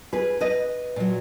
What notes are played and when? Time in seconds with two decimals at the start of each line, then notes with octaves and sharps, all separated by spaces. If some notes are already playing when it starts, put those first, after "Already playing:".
0.13 G#4 B4
0.40 B4 D#5
0.96 A#2 F#3